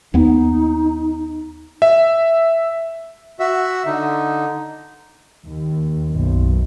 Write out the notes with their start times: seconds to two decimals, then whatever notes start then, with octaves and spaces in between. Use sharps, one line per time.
0.14 D#2 B3 D#4
1.82 E5
3.40 F#4 E5
3.86 D3 D#4
5.45 D#2
6.11 B1 F#2